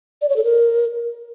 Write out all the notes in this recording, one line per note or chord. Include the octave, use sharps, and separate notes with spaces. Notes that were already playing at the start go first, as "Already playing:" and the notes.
D5
C#5
A4
A#4